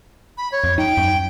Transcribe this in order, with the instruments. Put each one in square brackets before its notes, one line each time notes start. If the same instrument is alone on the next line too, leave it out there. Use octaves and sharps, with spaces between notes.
[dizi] B5
C#5
[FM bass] F2
[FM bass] D#4 [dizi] G5
[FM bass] F#2